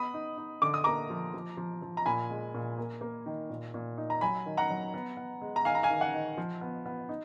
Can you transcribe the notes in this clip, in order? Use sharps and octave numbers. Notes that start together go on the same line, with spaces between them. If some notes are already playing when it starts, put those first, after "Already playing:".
Already playing: B3 B5 D#6
D#4
D#4
D3 D6
D#6
A#3 A#5 D6
F3
F3
F3
F3
A#5
A#2 G#5 B5
G#3
A#2
A#3
A#3
D#3
A#2
A#2
D#4
A#5
F#3 G#5 B5
D#3
F#5 A#5
F#3
B3
B3
G#3
A#5
D#3 F5 G#5
A#5
F5 G#5
D#3
F#5
D#3
F3
B3
B3
D#4